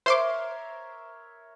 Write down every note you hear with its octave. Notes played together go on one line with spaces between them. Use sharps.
A#4 C5 C#5 E5 C6 D6